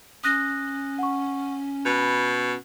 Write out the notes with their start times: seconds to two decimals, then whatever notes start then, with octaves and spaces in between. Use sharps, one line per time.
0.24 C#4 D#6 F#6 A#6
0.99 F#5 C#6
1.85 B2 B5